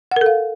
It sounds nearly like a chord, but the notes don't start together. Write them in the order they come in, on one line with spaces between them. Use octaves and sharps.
F#5 A#4 A4 F5